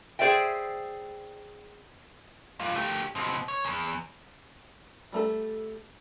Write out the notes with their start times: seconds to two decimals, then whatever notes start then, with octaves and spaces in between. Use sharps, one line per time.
0.19 G#4 C5 D5 E5 G5
2.60 G2 F4
2.75 A3 G4
3.15 B2 C4
3.48 C#5
3.65 E2
5.12 G3 A3 A4